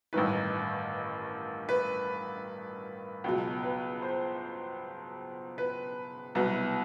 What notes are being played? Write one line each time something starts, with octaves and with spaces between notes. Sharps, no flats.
A1 G2 D#3 B4
B4
C#2 B2 F#3
B4
C5
B4
C2 B2 F#3 B4